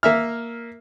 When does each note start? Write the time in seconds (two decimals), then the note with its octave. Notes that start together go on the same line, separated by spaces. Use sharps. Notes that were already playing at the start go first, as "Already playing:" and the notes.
0.03 A#3 E5 F6